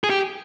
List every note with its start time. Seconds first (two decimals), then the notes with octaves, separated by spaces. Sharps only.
0.04 G#4
0.10 G4